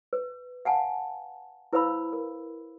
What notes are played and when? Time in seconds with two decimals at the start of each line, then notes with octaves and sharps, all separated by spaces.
0.13 B4
0.65 F5 F#5 G#5 A5
1.73 E4 B4 C5 F5 B5 E6
2.13 A#4